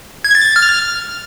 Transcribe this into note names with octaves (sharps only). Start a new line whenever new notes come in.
G#6
A6
A6
F6